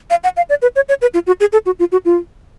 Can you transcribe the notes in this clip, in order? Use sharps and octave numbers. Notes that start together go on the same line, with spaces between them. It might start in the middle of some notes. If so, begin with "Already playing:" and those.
F5
F#5
F5
D5
B4
C#5
C#5
B4
F4
F#4
G#4
A4
F#4
F4
F#4
F4